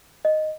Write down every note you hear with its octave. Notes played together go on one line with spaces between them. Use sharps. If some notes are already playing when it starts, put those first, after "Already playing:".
D#5